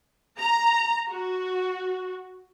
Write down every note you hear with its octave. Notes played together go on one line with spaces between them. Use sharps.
A#5
F#4